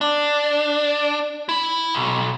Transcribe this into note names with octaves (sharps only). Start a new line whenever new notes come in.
D4
E4 B5
B1